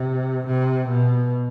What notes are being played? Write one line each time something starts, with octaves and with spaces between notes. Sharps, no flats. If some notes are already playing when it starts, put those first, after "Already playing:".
Already playing: C3
C3
B2